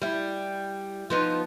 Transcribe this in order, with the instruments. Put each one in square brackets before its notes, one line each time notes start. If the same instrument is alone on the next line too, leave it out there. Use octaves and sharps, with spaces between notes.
[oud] G3 E4
F3 B3 D#4